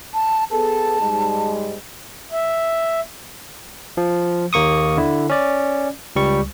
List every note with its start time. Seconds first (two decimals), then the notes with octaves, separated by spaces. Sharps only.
0.14 A5
0.51 B3 G#4 A4 A5
1.00 G#2 G3 G#3
2.32 E5
3.97 F3
4.53 D#2 A#3 C#6 D#6
4.97 D3 E4
5.29 C#4 D5
6.16 C#2 G3 C#6